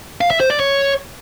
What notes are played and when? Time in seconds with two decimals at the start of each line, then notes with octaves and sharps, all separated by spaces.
0.21 F5
0.31 E5
0.40 C5
0.50 D5
0.60 C#5